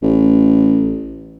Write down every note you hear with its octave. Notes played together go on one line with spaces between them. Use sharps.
A1